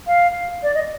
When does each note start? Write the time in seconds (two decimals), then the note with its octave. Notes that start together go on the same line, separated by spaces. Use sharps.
0.07 F5
0.63 D5
0.75 D#5